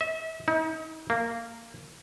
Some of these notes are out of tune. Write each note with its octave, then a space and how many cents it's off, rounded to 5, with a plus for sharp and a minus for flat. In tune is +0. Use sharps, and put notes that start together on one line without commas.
E5 -35
D#4 +40
A#3 -15